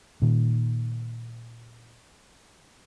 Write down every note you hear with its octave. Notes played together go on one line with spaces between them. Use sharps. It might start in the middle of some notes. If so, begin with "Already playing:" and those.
A#2 D#3